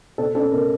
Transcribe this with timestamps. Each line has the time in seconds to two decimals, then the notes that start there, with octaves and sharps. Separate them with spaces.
0.18 B2 A4
0.35 C#4 A4
0.52 B2 A#4